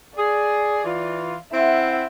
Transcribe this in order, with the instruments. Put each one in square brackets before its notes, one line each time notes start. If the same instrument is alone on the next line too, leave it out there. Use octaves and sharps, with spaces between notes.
[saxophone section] G#4 [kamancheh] D5
[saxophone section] E3 F4
[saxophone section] C4 E4 [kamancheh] E5 F#5